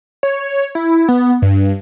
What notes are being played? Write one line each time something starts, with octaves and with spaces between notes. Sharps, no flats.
C#5
E4
B3
G2